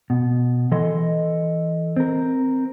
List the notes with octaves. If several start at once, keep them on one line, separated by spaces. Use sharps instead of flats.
B2
E3 A4 D#5 C6
C4 A#4